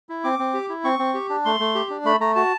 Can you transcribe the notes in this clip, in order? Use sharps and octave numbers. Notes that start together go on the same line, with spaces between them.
E4
C4 D6
C4
G4
E4
C4 C#6
C4
G4
D4
A3 C6
A3
G4
D4
A3 B5
A3 A#5
F#4 A5